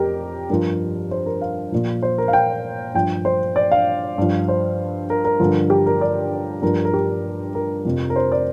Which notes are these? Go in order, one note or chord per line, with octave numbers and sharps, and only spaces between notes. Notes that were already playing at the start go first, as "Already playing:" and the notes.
Already playing: F2 G4 A#4
G2 F3 A#4
C5
A#4
F5
A#2 F3
C5
A#4
F5
G5
G2 F3 G5
C5
D5
F5
G2 F3
C5
A#4
A#4
G2 D3 F3
G4
A#4
D5
G2 F3 A#4
A#4
G4
A#4
F2 C3 F3
A#4
C5
D5